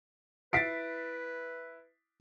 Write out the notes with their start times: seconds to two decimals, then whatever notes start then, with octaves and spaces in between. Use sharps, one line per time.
0.53 E4 B4 A6 B6 C7 D7